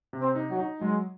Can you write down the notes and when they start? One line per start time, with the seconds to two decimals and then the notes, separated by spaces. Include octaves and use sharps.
0.13 C3
0.20 C4
0.36 D#4
0.51 F#3
0.59 D#4
0.81 F#3 G#3